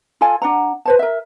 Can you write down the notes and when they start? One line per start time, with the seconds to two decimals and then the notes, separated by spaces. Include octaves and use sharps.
0.21 F4 A4 F5 G#5
0.42 D4 F#5 A#5
0.85 B4 C5 A5
0.99 A#4 E5